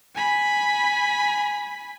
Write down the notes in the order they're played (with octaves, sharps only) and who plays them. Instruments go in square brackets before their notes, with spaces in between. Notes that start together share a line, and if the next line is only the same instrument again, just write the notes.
[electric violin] G#5 B5